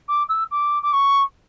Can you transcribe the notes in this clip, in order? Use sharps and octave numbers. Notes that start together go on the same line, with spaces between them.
D6
E6
D6
D6
C#6